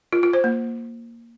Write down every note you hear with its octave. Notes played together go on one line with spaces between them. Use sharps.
F4
F4
C5
A#3